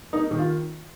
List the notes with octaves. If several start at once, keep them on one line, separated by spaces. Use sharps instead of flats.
A#3 D#4
D#3
F4